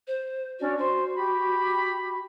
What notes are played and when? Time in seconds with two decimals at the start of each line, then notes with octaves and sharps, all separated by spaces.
0.07 C5
0.59 C#4 D4 F#4 D5
0.77 F#4 C5
1.14 G4 B5